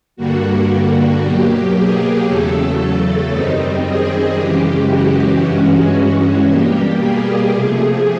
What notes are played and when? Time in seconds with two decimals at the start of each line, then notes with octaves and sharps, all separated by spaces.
0.16 G2 D3 G3 A#3 F#4
1.21 B2 F#3 A#3 G4
1.74 G#4
2.27 E2 C#3 F#3 A3 A4
3.31 F#2 D#3 G3 C4 D#4
3.84 G#4
4.36 F#2 C#3 E3 G#3 G4
4.89 F#4
5.41 G2 E3 G#3 C#4 F#4
6.46 B2 G3 A#3 G4
6.99 G#4
7.50 C3 F3 A3 G#4